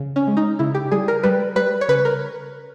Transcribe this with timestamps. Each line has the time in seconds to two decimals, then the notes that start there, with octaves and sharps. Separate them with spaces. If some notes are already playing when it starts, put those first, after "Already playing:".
Already playing: C#3
0.16 C#4
0.27 G#3
0.37 D#4
0.59 C#3 E4
0.75 G4
0.92 G3 G#4
1.08 A#4
1.23 G3 B4
1.56 G3 B4
1.81 C#5
1.88 C#3 B4
2.05 A#4